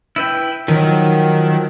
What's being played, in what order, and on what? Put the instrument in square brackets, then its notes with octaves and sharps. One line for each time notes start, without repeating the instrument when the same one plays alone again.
[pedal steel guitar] E4 B4 G5
[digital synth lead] D#3 [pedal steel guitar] F3 F#3